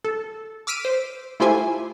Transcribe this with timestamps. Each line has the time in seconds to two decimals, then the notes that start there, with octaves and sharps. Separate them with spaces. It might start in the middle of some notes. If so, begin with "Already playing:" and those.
0.04 A4
0.67 D6 E6 F6 B6 D7 D#7
0.85 C5
1.40 A3 E4 F4 G4 C5 G#5